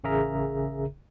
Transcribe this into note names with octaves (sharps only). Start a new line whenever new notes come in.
A1 C#3 G#4 A#4 E5 A#5